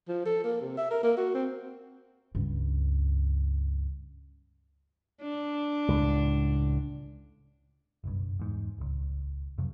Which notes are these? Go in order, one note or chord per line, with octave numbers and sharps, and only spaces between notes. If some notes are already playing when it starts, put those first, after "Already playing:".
F3
A4
A#3
C3
E5
A#4
A#3
F#4
C4
C#2 G2
D4
C#2 A2
F#1 B1 G2
E2 G#2
D#1 C#2
F2 C3 F3 F#3